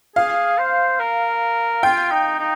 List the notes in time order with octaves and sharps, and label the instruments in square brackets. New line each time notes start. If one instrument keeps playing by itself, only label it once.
[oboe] G#4 [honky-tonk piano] F5
[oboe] C5
A#4
[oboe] F4 [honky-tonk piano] G5
[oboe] D#4
D#4